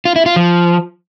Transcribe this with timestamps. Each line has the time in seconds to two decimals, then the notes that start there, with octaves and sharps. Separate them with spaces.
0.05 F4
0.16 E4
0.26 F4
0.36 F3